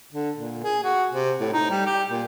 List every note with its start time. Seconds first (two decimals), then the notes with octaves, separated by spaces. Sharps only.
0.12 D3
0.36 A#2
0.64 G#4
0.83 F#4
1.11 C3
1.40 A2
1.53 D#4
1.70 G3
1.86 G4
2.10 A#2